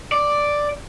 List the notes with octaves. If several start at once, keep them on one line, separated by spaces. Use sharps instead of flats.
D5